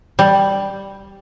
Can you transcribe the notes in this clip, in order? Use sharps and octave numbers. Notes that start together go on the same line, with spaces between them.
G3